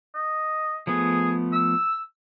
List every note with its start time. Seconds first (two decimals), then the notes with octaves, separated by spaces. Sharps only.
0.15 D#5
0.87 F3 A3 B3 G#4
1.53 E6